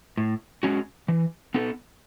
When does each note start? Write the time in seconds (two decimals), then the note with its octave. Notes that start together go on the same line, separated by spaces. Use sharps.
0.17 A2
0.63 G#3 C#4 F#4
1.08 E3
1.54 B3 D#4 A4